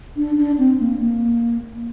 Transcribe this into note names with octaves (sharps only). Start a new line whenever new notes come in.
D4
D4
C4
A#3
A#3